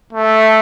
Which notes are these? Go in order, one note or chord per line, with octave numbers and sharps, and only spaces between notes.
A3